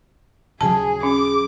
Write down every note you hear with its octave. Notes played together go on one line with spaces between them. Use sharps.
D#1 C#3 F#3 G#4 G#5 A5
C#4 G#4 D6